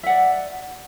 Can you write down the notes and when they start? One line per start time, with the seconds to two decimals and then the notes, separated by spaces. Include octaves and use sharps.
0.03 E5
0.06 F#5
0.10 D5